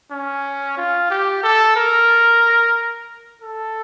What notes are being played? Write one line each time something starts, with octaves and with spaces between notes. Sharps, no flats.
C#4
F4
G4
A4
A#4
A4